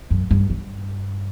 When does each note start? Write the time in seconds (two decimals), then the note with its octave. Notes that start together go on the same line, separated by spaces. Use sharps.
0.11 F#2
0.31 G2
0.50 G2